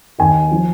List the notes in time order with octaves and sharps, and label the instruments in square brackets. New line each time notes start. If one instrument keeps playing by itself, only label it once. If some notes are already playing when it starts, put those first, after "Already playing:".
[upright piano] D#2 D#3 G#5
F3